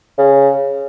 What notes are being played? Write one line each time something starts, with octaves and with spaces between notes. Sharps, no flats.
C#3